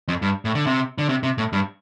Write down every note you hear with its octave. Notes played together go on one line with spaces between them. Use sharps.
F2
G2
A2
D3
C3
D3
C3
C3
A2
G2